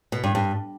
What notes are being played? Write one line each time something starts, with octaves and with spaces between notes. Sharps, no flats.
B2
G2
G2